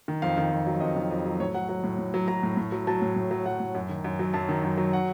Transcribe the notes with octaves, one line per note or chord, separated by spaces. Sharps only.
D#3
F2 F5
D#3
F2
F#3
F2 D#5
D#3
F2
F#3
A2 C#5
F#3 F#5
F#3 F#5
A2
A2
F#3
F#3 A#5
A2
A2
F#3
F#3 A5
A2
A2
F#3
F#3 F#5
A2
F#2
D#3
F#2
F#3
F#2 A5
D#3
F#2
F#3
F#5